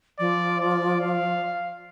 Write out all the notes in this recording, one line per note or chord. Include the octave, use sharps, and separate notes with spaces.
F3 D5
D5
F5